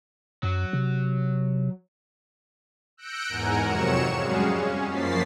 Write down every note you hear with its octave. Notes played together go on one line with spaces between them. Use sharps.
F#2 F#3
C3
E6 F#6 G6 A#6 C#7 D7
E2 G#2 A#4 F#5 G#5 A#5
F2 C3 F#3 C#5 C#7 E7
G3 G#3 C#4 F#4 G#4 F5
C#4
F#2 F3 A#3 A6 B6 C7